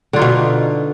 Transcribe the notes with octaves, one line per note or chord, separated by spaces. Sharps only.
B2 D3 D#4 F4